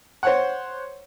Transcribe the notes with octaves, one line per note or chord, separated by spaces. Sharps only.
C5 C#5 F#5